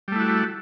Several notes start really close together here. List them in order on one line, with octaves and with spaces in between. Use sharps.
G3 A3 E4 F#4